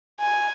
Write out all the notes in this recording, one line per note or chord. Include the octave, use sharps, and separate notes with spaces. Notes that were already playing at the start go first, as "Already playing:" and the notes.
G#5